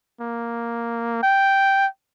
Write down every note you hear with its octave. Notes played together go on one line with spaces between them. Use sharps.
A#3
G5